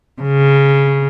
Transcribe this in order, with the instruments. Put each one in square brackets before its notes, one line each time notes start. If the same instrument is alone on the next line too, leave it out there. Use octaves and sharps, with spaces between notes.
[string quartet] C#3